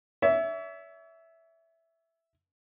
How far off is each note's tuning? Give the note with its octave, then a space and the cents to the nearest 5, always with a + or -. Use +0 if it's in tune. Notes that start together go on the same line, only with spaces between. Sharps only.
C#5 +40 E5 +0